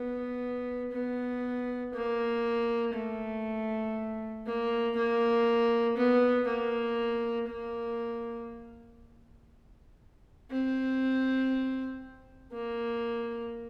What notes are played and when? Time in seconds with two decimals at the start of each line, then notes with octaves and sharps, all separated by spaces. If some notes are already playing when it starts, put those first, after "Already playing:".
Already playing: B3
0.92 B3
1.94 A#3
2.94 A3
4.46 A#3
4.96 A#3
5.96 B3
6.47 A#3
7.48 A#3
10.51 C4
12.52 A#3